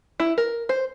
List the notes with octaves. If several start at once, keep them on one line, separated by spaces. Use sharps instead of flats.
E4
A#4
C5